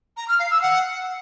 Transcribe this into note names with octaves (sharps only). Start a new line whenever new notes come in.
A#5
F6
F5
E6
F#5